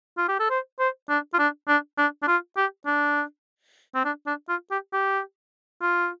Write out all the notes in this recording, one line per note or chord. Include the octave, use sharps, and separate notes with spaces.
F4
G4
A4
C5
C5
D4
F4
D4
D4
D4
D4
F4
G4
D4
C4
D4
D4
F4
G4
G4
F4